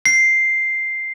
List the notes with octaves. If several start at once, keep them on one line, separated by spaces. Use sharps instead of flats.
C7